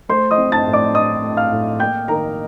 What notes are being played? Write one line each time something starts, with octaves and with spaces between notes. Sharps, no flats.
A3 C5 C6
D#5 D#6
C4
A5 A6
A2
D5 D6
C4 D#5 D#6
A3
F5 F6
A2
A#3 G5 G6
D#3 A#4 A#5